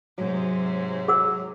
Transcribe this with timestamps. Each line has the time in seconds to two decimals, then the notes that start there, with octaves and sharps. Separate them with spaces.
0.18 G#2 C3 F#3
1.08 G#4 F#5 E6